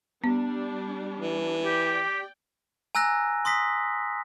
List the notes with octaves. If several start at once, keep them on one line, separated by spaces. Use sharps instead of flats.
G3 B3 D4
E3
G4 D5 G5
G#5 A#5 E6 F#6 A#6
C6 D#6 A#6 B6